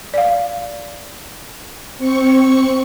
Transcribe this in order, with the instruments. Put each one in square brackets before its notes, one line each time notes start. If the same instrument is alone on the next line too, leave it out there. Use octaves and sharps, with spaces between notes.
[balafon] D5 F5
[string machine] C4 C#6 C#7